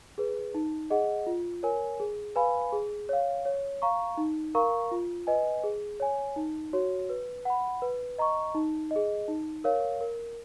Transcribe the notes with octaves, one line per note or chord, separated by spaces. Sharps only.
G#4 B4
D#4
G#4 D#5 F#5
F4
A#4 C#5 G#5
G#4
B4 F5 G#5 B5
G#4
C#5 F5
C#5
F5 A#5 C#6
D#4
A#4 F5 A#5 C#6
F4
B4 D#5 G#5
G#4
C#5 G#5
D#4
F#4 C#5
B4
F#5 B5
B4
D#5 A#5 C#6
D#4
D#5
G#4
D#4
A#4 C#5 F5
A#4